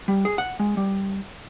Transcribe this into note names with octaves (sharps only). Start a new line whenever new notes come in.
G3
G#4
F#5
G#3
G3